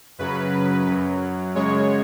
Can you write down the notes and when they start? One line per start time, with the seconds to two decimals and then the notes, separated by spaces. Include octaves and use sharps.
0.19 F#2 C#3 F#3 B4
0.87 F#2 F#3
1.55 F#2 C#3 G#3 C#5